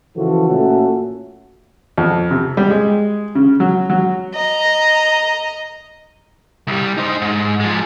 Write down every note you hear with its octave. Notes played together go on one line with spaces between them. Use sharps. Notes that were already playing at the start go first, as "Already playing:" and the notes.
C#3 E3 F3 F#4 A4
A#2 A3 A#3 C#4 F#4 A4
F2
C3
G3
G#3
C#3
F#3
F#3
D#5 A#5
C2 G3
D#4 C5
G#2
F3 G#3